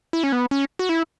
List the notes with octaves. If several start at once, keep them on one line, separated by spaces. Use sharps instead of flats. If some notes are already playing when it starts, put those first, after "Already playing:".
E4
C#4
B3
C#4
F#4
E4